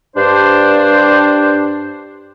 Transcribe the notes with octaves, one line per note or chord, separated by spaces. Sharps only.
G2 D4 C5